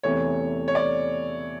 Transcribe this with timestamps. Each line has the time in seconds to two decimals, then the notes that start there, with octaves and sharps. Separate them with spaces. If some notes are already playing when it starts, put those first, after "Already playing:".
0.03 E2 C3 E3 A3 C#5
0.68 C#5
0.75 D5